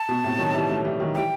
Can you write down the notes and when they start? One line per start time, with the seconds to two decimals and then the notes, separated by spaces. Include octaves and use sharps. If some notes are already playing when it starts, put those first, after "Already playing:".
Already playing: A5
0.09 B2
0.23 A2 C3
0.39 D#3 F#3
0.54 E3 G3
0.69 F#3 A3
0.85 E3 G3
1.00 D#3 F#3
1.15 E3 G3 G5